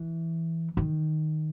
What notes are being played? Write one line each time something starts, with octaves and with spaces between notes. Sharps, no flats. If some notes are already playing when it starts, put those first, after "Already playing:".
Already playing: E3
D#3